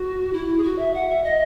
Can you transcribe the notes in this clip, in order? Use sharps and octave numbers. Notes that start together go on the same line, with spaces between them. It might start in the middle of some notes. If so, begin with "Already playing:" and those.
Already playing: F#4
E4
G#4
F#4
E5
F#5
E5
D#5